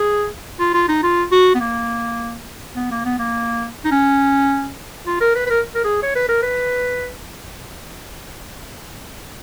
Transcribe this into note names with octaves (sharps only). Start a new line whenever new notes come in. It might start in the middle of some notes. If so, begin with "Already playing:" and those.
Already playing: G#4
F4
F4
D#4
F4
F#4
B3
A#3
B3
A#3
B3
A#3
D#4
C#4
F4
A#4
B4
B4
A#4
A#4
G#4
C#5
B4
A#4
B4